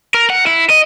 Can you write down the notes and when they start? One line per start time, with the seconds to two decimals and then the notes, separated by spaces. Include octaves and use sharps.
0.14 A#4
0.30 F#5
0.47 E4
0.70 D#5